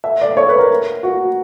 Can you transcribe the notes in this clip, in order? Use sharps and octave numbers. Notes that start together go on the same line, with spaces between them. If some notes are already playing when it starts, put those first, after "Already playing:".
E5
D5
C#5
B4
A#4
F#4